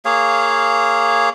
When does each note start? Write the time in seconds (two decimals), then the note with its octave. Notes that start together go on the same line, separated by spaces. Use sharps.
0.05 A#3 G#4 C#5 F5